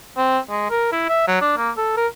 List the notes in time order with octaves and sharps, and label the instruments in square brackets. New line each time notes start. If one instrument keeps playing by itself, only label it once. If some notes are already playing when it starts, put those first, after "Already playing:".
[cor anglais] C4
G#3
A#4
E4
E5
F#3
D4
A#3
A4
A#4